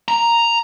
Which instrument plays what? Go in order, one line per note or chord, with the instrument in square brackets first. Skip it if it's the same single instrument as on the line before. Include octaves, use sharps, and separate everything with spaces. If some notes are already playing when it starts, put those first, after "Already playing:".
[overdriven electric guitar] A#5